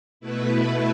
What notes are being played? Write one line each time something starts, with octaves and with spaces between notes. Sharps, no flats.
B2 A3 E4 B4